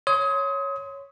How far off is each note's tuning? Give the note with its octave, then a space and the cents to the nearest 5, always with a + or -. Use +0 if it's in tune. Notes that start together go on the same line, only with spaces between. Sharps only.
C#5 +0 C6 -15 D#6 +30